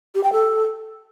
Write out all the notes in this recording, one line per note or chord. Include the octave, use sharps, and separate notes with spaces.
G4
G5
A4